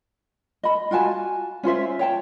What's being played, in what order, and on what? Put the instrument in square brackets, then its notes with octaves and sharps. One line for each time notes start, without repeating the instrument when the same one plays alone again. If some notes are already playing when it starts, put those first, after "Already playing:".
[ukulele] D#5 B5
F4 F#4 G#5 A5
C#4 F4 C5 E5
C#5 G5 A5